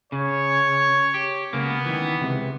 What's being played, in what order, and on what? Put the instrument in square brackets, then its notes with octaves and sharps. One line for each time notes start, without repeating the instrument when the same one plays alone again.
[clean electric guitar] C#3 [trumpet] C#5
[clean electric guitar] G4
[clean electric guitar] C#2 C#3 A#3 [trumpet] B3
[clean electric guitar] D#3 E3
C#2 C3